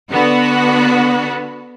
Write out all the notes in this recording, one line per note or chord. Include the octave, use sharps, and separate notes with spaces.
D3 B3 F#4